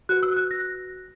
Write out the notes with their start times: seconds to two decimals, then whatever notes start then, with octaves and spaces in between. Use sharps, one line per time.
0.09 F#4 B4 F#6
0.23 E6
0.36 F#6
0.51 A#6